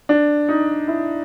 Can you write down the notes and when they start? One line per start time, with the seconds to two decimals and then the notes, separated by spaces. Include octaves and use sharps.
0.09 D4
0.49 D#4
0.88 E4